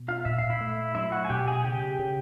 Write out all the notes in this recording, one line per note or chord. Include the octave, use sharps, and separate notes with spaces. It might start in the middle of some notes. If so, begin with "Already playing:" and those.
Already playing: B2
F4 F5
A#2 E5
F5
E4 E5
A3
F#3 E4 E5
F#4 F#5
G#5
B2 G4 G5
G#4 G#5
C#3 G4 G5
C#3